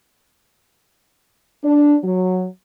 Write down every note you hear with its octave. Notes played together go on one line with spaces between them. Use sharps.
D4
F#3